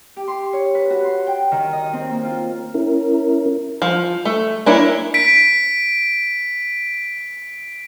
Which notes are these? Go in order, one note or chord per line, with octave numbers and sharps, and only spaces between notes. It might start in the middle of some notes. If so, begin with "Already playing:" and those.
G4
C6
C#5
B4
F#4
C6
G5
D#3
D#5
C4
A#3
F4
C#4 E4 A#4
F3
A3
A#3 D4 E4 C#5
B6 D7